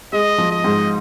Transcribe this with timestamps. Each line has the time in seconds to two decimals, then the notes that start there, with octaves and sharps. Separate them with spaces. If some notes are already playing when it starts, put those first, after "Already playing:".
0.13 G#3 D#5
0.38 F3
0.51 D#5
0.64 G#2